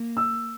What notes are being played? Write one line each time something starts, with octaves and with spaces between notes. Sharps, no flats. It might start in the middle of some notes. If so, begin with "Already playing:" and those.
Already playing: A#3
E6